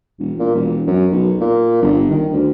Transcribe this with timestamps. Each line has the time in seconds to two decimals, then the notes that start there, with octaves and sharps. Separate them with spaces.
0.19 E1
0.39 A#2
0.55 E1
0.87 F#2
1.11 B1
1.40 A#2
1.82 G1
2.10 D#3
2.32 D2